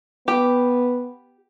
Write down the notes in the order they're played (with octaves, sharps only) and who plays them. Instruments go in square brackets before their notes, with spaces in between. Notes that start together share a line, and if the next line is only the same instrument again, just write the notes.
[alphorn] B3 [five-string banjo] G4